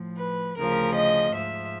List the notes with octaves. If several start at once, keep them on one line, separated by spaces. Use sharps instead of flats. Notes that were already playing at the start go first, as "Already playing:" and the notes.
Already playing: A2 F3
B4
D2 C#3 F3 A#4
D#5
G#2 F3 E5